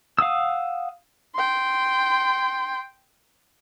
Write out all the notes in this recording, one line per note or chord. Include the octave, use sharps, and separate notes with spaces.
F5 F#5 D#6 E6
G5 C6